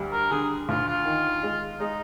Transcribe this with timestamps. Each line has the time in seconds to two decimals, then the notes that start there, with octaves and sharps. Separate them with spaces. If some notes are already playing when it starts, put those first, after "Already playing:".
Already playing: D2 G3
0.12 A#4
0.31 D3 G#4
0.69 D2 F4
0.87 F4
1.06 D#3
1.43 G#3
1.80 G#3 D#4